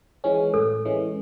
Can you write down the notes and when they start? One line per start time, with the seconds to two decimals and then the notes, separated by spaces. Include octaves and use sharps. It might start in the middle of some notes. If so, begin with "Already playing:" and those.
0.24 E3 G#3 C#4
0.54 A2 A4
0.85 E3 G#3 C#4